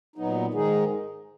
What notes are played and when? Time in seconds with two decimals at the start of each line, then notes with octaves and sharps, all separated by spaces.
0.16 A#2 F#3 B3 D#4
0.54 G#2 D#3 G#3 D#4 G#4